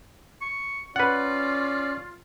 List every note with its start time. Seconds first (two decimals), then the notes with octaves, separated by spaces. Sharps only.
0.41 C#6
0.96 C#4 F4 B4 D5 F#5